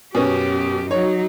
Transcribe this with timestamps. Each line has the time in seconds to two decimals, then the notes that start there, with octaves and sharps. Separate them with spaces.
0.15 F#2 B2 B3 C#4 G4
0.91 F#3 D#4 C#5